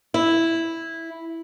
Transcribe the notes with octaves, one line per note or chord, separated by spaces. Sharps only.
E4